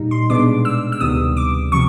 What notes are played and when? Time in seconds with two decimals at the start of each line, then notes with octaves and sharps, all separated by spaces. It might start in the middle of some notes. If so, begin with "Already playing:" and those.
Already playing: A#2 G3 D#4
0.11 C6
0.30 B2 G#3 B3 D4 D6
0.65 E6
0.92 E6
1.00 D2 C3 D#3 G3 B3 D#6
1.37 D6
1.72 C3 F3 C#6